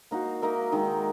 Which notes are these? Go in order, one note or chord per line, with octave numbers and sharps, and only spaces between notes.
A#3 D#4 F#4
A#3 D#4 A#4 E5
D#3 G#3 D#4